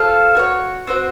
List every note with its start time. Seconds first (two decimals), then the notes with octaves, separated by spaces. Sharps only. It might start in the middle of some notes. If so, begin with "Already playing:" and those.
Already playing: F4 A4 C5 F5
0.35 F#4 A#4
0.39 C#5
0.87 C4 F#4 C5